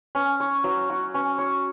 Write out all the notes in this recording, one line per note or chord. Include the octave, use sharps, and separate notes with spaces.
C#4
C#5
F#3
F#4
C#4
C#5